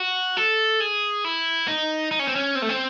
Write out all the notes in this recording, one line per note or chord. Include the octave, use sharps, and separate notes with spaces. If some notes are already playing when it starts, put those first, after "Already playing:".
Already playing: F#4
A4
G#4
E4
D#4
D#4
C#4
C4
C#4
C4
A3
C4